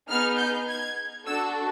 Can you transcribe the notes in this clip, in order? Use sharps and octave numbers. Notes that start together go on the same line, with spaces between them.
B3 D#4 G#4 F6
G6
G#6
D4 F#4 A4 E6